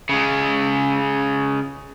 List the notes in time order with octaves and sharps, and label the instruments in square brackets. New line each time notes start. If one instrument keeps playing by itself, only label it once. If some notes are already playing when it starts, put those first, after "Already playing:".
[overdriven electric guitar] C#3 G#3